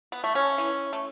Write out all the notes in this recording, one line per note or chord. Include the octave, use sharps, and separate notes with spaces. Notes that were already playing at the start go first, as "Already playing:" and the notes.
B3
A3
C#4
E3
A3